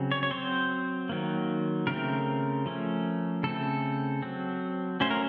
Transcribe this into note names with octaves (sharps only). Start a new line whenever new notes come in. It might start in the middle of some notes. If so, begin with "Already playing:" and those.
Already playing: C#3 F#3 C4
C#5
C#5
F#3 C4 C5
D#3 F#3 A#3
C#3 A3 C4 A#4
F3 A3 C#4
C#3 A3 C4 A4
F#3 C4
F#3 A3 C#4 C5
A#4